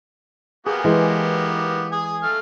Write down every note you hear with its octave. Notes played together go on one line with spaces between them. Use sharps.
A#3 B3 G4 G#4
E3 G#3
G#5 D#6
A3 F5